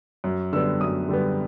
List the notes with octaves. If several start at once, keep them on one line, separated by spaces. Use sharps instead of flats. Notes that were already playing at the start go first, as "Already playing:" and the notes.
F#2
D3 G3 B3 E6
F#2 D#6
D3 G3 B3